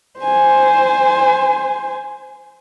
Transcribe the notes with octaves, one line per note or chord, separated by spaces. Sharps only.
C5 G#5